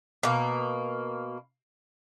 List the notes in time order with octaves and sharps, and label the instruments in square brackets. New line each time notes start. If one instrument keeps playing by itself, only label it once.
[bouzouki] B2 A#3